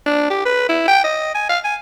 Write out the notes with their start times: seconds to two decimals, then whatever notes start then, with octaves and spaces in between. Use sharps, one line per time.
0.06 D4
0.30 G4
0.45 B4
0.69 E4
0.88 G5
1.04 D#5
1.35 G#5
1.49 F5
1.64 G#5